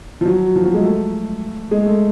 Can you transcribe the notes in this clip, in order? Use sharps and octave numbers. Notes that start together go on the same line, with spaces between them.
F3
F#3
F3
F#3
G#3
A3
G#3
A3